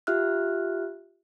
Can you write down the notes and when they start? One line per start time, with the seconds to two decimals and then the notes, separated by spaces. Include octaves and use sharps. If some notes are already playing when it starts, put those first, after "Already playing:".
0.07 F4 G4 E5 F6 F#6